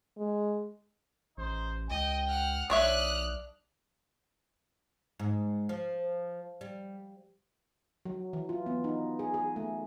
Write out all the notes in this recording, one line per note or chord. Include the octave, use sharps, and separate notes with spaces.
G#3
A1 D#4 C5
C#2 D#5 G5
F#5 F6
B1 D4 C#5 E5 D#6 F6 F#6
G#2
F3
G3
F#3
E3
F4
B3
D#4
G#4
G#4
A3